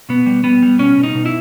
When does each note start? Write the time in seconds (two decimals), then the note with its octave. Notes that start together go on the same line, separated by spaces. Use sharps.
0.09 B2 B3
0.26 G3
0.44 G3 B3
0.62 G3
0.79 B2 C#4
0.98 B2
1.03 D#4
1.15 B2
1.26 E4